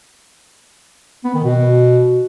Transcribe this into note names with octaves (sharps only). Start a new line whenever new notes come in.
B3
D#3
B2